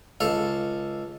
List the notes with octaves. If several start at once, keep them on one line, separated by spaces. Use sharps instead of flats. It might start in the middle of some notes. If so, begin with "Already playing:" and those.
C#2 A4 F5